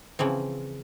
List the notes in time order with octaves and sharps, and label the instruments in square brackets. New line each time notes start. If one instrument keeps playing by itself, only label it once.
[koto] C#3 E3 F3 C4